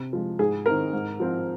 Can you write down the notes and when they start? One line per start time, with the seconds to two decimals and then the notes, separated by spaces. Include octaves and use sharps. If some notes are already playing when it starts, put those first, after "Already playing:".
Already playing: C3
0.13 F3 G#3
0.39 G#2 G#4
0.66 D#3 C4 A#4
0.93 G#2
1.20 F3 C4